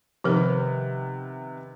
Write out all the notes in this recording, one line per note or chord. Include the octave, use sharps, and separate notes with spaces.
C3 D#3 F3 B3 A#4